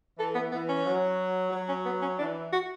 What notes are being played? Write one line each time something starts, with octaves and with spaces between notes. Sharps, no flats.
E3 A4
B3
E3 B3
C#4
F#3
F#3
C#4
B3
C#4
E3 D4
F#4